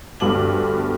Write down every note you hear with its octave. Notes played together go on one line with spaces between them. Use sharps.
D2 G2 B3 A4 D6 F#7